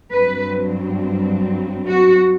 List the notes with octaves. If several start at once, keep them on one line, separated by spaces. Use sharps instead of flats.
G2 F#3 C4 B4
F#4